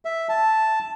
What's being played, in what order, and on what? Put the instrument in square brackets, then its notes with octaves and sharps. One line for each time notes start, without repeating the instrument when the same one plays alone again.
[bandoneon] E5
A5